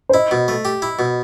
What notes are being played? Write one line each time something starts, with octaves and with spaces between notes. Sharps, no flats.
C5
E4 D#5
B2
A3
G4
E4
B2